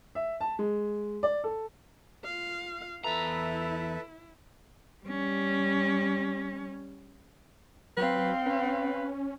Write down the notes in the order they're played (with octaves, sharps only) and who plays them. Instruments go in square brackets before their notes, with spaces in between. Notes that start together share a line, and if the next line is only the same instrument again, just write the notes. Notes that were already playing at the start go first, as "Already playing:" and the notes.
[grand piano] E5
A5
G#3
D5
A4
[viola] F4 F5
[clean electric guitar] E2 A#5 [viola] E4 [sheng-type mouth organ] A4 B4 E5
[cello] G3 C#4
[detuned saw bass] F#3 [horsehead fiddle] C4 F5 [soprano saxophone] B4
[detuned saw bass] C#4 [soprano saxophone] B4